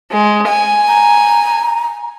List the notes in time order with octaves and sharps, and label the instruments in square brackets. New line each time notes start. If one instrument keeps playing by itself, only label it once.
[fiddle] G#3
G#5
[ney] A#5